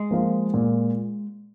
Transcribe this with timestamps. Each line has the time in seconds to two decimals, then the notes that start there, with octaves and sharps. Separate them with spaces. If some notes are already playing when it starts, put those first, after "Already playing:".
Already playing: G#3
0.11 F3 A#3 F4
0.54 A#2